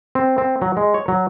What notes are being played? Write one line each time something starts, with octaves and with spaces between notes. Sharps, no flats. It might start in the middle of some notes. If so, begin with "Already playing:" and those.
C4
C4
F#3
G#3
C#5
F#3